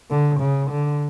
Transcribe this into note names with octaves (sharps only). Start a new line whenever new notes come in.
D3
C#3
D3